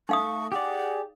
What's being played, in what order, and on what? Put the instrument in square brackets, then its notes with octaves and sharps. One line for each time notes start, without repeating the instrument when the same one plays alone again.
[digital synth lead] A3 [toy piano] D#4 F5 D#6 [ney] C#6
[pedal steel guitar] G4 D5 [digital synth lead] G#4 [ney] F#5